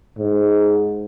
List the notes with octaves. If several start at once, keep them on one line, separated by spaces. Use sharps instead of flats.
G#2